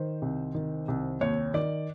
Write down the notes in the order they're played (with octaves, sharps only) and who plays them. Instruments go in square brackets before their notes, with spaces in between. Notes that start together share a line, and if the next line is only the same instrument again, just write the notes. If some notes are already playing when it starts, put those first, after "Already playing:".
Already playing: [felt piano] D#3 C5
C2
D#3
C2
D#2 C#5
D#3 D5